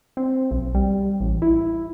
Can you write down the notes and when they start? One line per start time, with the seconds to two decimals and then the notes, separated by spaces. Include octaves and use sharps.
0.17 C4
0.51 B1
0.75 G3
1.20 A1
1.42 E4